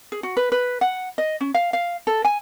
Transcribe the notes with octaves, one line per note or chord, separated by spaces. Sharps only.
G#4
F#4
B4
B4
F#5
D#5
C#4
F5
F5
A4
G#5